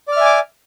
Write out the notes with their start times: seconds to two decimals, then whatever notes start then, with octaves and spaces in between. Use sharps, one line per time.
0.08 D5
0.12 F6
0.16 E5
0.21 G#5
0.25 D6